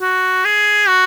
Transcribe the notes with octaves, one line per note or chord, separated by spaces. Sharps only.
F#4
G#4
F#4